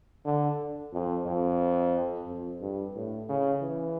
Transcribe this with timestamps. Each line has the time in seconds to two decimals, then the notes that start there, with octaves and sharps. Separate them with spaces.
0.25 D3
0.93 F2
1.26 F2
2.27 F2
2.61 G2
2.95 A2
3.29 C#3
3.62 E3